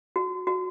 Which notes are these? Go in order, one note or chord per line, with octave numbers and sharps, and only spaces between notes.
F#4
F#4